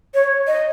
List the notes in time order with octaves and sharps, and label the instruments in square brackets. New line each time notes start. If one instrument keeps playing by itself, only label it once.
[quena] C#5
D#5